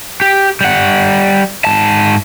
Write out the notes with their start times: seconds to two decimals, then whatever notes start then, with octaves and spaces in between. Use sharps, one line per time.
0.21 G4
0.61 G3 F#5
1.65 G#2 A5